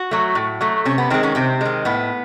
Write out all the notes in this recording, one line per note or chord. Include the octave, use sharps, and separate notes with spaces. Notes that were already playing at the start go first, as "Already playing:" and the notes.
Already playing: F#4
F#3 A3
A2
F#3 A3
C3 C#4
B3
D#3 G#3 C4
C#4
C3 C4
D#3 G#3
A2 B3